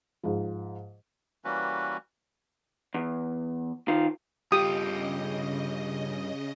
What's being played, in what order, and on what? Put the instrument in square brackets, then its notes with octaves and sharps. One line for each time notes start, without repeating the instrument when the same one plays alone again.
[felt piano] G#2 F3
[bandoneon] E3 G3 A#3 C#4 F#4 B4
[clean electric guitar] E2
D#3 F4
[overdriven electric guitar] G2 F4 [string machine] C#3 D#5 [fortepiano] G4 [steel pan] D#6